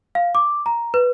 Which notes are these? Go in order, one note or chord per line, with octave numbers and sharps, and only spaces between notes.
F5
D6
A#5
B4